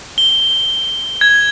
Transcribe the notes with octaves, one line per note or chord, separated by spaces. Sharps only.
G7
G#6